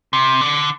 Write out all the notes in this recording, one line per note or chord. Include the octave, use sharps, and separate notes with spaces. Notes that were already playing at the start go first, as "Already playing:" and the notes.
C3
D3